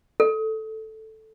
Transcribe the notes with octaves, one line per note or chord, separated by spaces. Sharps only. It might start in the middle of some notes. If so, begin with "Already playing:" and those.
A4